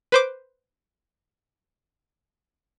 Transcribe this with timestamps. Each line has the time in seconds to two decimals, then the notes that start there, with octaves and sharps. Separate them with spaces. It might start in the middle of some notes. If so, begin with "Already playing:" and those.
0.12 B4 C5 D6